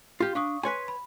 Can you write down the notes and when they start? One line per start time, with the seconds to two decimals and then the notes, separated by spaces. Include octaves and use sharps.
0.20 F4 G4 F5
0.35 D4 F5 C#6 D#6
0.63 B4 C#5 G#5 C6 B6
0.88 B5